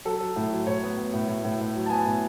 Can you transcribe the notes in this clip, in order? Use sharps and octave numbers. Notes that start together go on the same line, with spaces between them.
F#3 A4
F#3
A2
F#3
A2 C#5
B3
B3
A2
A2
A2
A2
F#3
A5
B3 G#5
A2